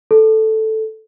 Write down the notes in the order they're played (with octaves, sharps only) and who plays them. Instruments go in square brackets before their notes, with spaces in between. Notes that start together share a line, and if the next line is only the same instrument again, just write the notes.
[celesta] A4